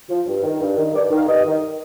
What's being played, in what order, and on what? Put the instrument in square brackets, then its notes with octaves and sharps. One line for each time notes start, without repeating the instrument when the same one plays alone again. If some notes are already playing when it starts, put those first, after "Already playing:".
[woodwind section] F3
G2
D#3
G2
D#3
G2 D5
D#3
F5
G2 D#5
D#3